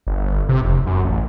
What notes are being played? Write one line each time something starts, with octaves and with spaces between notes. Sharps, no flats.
G1
C3
F1
F#2
A1